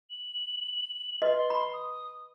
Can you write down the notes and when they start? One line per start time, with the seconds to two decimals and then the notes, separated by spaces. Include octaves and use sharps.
0.10 F#7
1.22 B4 D#5 C6
1.50 B5
1.73 D#6